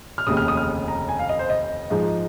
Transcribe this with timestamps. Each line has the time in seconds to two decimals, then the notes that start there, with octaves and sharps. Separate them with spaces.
0.18 F6
0.27 F1 D#2 C#3 D#6
0.37 F6
0.48 D#6
0.57 F6
0.88 A#5
1.09 G#5
1.19 F5
1.29 D#5
1.39 C5
1.50 D#5
1.90 G#2 F3 G#3 D#4